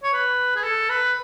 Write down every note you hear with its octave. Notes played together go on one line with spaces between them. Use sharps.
C#5
B4
G#4
A4
B4